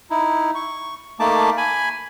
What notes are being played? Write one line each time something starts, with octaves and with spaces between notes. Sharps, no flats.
D#4 E4
C#6
A3 A#3 D#4 A5 D6
G#5 B5